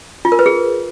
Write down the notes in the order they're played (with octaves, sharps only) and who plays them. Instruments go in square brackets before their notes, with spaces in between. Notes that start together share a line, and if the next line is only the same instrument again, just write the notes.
[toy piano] F4
A#4
B4
G#4